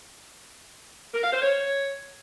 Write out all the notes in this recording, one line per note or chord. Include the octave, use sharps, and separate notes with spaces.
A#4
F5
C5
C#5